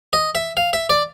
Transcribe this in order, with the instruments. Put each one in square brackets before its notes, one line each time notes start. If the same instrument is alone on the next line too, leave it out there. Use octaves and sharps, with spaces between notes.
[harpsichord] D#5
E5
F5
E5
D5